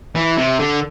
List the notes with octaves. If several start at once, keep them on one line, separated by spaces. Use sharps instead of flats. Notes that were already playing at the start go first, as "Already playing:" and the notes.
E3
C3
D3